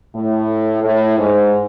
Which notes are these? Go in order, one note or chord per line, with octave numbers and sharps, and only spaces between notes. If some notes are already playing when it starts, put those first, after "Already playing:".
A2
A2
G#2